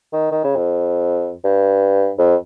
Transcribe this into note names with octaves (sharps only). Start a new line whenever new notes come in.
D#3
D#3
C#3
F2
G2
F2